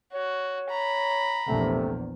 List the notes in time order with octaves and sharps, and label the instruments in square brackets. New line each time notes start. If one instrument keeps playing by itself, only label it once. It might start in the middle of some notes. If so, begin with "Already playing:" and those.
[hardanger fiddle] F#4 [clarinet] C#5
[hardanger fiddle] A#5 B5
[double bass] A#1 E2 [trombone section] C3 A3